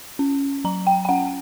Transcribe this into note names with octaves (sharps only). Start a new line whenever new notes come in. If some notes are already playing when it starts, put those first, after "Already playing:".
C#4
F#3 A#5
G5
G5
C#4 F#5